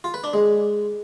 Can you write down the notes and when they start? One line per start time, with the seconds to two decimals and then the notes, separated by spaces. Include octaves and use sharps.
0.04 F4
0.14 B4
0.24 D4
0.33 G#3